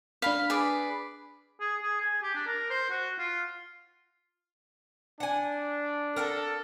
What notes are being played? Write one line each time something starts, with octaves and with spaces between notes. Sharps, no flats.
D4 F5 B5 B6
G#4 B4 D5
G#4
G#4
G#5
G4
D4
A#4
C5
F#4
F4
D4 F#5 G#5
A4 A#4 F#5 A#5